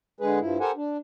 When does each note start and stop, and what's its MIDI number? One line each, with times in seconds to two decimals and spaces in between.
0.20 0.39 50
0.20 0.39 56
0.20 0.39 68
0.20 0.39 71
0.40 0.58 43
0.40 0.58 53
0.40 0.58 64
0.60 0.71 67
0.60 0.71 69
0.60 0.71 70
0.60 0.71 72
0.60 0.71 78
0.60 0.71 80
0.76 0.97 62